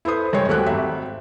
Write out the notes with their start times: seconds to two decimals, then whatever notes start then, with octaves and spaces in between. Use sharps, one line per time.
0.05 E4 A4 B4 C5 D#6
0.33 G2 G#3 C5 C#5 G5
0.48 D#2 F#3 A3 G4 F#5 F#6
0.66 G#1 E5